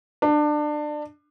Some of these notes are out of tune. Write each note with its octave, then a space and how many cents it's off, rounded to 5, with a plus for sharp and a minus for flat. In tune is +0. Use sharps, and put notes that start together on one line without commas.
D4 +25